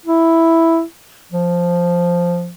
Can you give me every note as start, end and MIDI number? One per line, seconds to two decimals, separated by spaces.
0.06 0.83 64
1.32 2.52 53